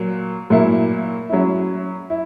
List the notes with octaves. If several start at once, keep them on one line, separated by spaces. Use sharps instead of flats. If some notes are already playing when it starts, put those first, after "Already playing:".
Already playing: A#2 F#3 A#3
A#2 F#3 A#3 E4
F#3 C#4 E4
E4